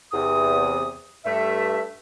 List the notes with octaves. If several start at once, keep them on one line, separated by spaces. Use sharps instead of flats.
E2 C3 D#6
G2 A3 E5